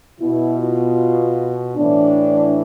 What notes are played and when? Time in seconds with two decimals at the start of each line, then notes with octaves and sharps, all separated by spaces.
0.20 B2 E4
0.59 F4
1.76 A2 E3 D4